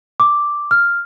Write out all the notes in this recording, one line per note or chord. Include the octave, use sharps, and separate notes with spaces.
D6
F6